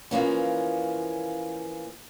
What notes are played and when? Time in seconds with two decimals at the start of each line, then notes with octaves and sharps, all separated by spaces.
0.11 E3 F3 A#3 C#4